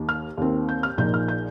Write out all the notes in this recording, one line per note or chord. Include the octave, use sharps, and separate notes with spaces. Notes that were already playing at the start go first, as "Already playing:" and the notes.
Already playing: D#2 D#3 A#3
F6
D#2 D#3 C4
G6
F6
A#1 A#2 F3 A#3 D#4 G6
F6
G6